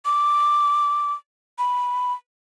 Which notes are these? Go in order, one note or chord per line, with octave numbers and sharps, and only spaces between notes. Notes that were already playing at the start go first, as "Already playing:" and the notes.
D6
B5